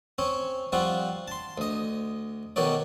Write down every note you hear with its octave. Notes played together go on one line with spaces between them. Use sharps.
C4 C#4 C#5
F3 G3 C4 F4 F#4
A5 C6
D2 D#5
B1 B2 D#3 C#5 D5